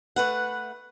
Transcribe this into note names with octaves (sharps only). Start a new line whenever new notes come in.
A3 B4 F#5